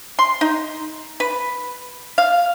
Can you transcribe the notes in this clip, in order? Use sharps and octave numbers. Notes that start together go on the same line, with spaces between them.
C6
D#4
B4
F5